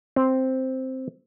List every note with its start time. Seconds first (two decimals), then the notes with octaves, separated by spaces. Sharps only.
0.16 C4